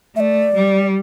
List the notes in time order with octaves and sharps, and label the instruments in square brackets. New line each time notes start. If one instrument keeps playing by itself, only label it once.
[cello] A3 [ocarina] D5 E5
[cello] G3